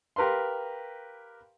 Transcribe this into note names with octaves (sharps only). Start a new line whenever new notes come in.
G4 A#4 B4 F5 C6